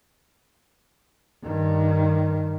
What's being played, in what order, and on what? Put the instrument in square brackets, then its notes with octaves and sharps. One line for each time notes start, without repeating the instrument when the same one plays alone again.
[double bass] G2 D#3